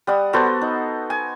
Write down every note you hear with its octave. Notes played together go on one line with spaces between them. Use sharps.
G3 F#5 D#6
B3 F#4 A4 C5
D#4
G#5